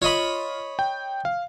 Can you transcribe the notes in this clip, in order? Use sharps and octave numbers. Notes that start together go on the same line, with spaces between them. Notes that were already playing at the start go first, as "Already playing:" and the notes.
F4 C#5 D#5 B5
G5
F5